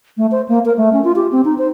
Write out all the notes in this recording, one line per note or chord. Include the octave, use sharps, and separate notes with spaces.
A3
C5
A#3
A#4
A3
C#4
F4
G4
C4
D#4
C5